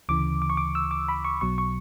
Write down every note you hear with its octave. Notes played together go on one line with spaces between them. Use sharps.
D2 C#3 E3 D6
D6
C#6
D6
E6
D6
B5
C#6
B1 B2 F#3 C#6
C#6